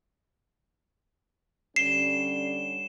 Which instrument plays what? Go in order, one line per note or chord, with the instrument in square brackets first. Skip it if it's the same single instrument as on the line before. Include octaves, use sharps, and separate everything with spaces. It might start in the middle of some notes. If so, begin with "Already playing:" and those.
[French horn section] D3 G3 C#4 [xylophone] C7 [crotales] E7 G7